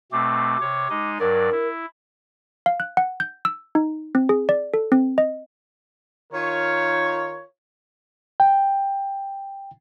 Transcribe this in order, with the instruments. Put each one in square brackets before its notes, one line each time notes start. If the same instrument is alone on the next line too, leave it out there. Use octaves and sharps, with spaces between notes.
[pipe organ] B2 A3 C4 [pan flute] D6
[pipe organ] C3 C#5
G#3 D#4 D#5
[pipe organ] G2 F#3 D5 [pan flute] A#4
[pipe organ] E4
[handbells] F5
F#6
F#5
G6
E6
D#4
C4
G#4
D5
A4
C4
D#5
[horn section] D#3 F4 A#4 C#5
[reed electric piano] G5